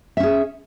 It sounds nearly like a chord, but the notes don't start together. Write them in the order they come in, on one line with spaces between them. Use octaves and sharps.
E5 C#4 G#4